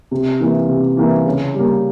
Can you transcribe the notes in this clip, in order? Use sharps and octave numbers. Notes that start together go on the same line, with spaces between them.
C3
E3 A#3 E4
C3
E3 A#3 E4
C#3
G3 A#3